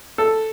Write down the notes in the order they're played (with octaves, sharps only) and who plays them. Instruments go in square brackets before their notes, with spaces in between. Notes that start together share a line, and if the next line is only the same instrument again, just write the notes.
[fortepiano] A4